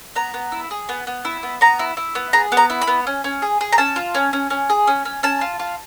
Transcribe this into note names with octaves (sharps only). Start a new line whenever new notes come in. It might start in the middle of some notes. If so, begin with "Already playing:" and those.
B3 A#5
B3
E4
G#4
B3
B3
E4
B3
B3 A#5
E4
E4
B3
G#4 A#5
B3
A#5
E4
B5
B3
C#4
C#4
G#4
G#4
A#5
C#4 A5
F4
C#4
C#4
C#4
G#4
C#4
C#4
C#4 A5
F4
F4